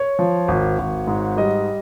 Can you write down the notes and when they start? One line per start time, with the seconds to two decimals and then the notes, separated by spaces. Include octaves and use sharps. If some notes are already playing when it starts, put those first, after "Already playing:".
Already playing: C#5
0.19 F3
0.48 G#1
0.79 G#1
1.07 G#2
1.37 G3 D#5